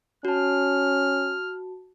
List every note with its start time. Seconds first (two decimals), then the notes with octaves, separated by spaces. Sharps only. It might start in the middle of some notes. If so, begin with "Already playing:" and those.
0.25 C#4 F#4 A5 F6